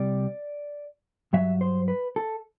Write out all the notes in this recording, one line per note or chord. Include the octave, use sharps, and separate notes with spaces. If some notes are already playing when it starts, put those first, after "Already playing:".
Already playing: C2 C3 G3 D5
G2 F#3 E5
C5
B4
A4